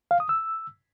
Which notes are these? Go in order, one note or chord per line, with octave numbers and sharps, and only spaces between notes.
F5
D#6
E6